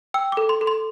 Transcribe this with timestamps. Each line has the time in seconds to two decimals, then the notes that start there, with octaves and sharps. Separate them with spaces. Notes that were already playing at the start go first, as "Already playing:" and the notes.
0.14 G5 E6
0.32 D6
0.37 A4
0.49 C6
0.61 A4
0.67 C6